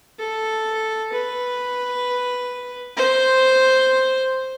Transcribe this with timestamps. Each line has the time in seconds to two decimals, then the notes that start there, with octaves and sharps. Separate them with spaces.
0.19 A4
1.12 B4
2.97 C5